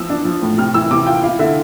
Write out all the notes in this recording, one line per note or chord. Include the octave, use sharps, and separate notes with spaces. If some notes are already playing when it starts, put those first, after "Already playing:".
Already playing: E3 F3 E6
D4
F3
A2
C3 F6
E3 E6
C3 D6
F4 G5
E4 F5
D3 E5